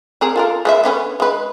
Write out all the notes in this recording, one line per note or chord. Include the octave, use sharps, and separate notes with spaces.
C4 G#4 A#4
F4 A4 A#4
G#3 B4 E5
D3 B3 C#4
G#3 B4